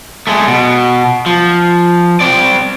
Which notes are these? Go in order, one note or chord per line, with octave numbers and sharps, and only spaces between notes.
G#3 A3
B2
F3
C4 D5